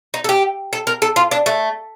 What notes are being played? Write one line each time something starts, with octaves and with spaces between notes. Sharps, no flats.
D#4
A4
G4
A4
A#4
A4
F4
D4
A3